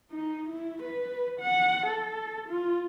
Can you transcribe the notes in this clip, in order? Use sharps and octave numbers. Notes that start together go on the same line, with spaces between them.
D#4
E4
B4
F#5
A4
F4